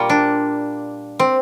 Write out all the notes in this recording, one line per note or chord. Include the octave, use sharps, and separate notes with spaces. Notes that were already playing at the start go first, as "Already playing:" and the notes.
Already playing: A#2 G3 A#3 F4
D4
C4